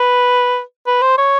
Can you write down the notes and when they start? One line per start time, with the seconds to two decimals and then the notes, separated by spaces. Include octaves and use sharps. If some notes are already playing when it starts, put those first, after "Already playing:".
Already playing: B4
0.87 B4
1.02 C5
1.18 C#5